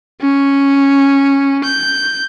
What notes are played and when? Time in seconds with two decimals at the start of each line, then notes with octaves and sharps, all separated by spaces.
0.21 C#4
1.64 G6